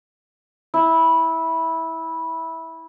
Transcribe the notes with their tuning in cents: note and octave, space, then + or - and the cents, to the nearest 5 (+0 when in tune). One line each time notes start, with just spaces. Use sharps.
E4 -15